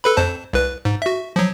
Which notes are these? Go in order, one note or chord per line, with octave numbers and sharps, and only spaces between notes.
A4 B4 B5
F2 C5 A5
C2 B4
G#2
F#4 E5
F3 F#3